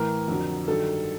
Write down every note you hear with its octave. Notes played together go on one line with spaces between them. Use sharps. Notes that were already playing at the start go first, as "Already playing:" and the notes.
Already playing: A2 E3 A#4
F2 D3 F#3
G2 D#3 F#3 A4